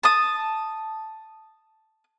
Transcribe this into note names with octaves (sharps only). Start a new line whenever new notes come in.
A5 D#6